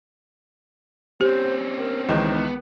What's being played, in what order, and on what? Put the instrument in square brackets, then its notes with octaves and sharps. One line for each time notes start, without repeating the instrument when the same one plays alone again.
[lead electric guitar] C4 C#4 [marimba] G4 [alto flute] C5
[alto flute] A#4
[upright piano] C#2 D#3 E3 [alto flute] D#4
[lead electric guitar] B3